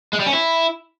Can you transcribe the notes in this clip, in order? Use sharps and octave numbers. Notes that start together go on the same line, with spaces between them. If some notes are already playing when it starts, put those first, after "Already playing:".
G#3
G3
C#4
E4